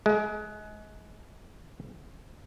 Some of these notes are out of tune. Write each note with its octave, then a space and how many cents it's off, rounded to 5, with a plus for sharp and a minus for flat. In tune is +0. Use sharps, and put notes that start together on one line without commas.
G#3 +30